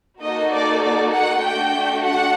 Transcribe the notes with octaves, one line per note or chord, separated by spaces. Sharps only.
A#3 D#4 F#4 A4 D#5
D5
D5
F#5
A3 D4 F#4 G5
F#5